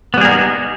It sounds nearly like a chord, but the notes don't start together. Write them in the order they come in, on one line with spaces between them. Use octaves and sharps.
B3 G3 G#4 A#4 D#4